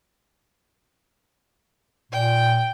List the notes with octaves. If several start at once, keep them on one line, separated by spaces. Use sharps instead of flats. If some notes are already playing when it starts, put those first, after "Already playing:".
A#2 G5